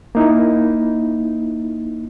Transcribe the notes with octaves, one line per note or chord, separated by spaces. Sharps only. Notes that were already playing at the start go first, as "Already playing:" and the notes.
A#3 D#4 E4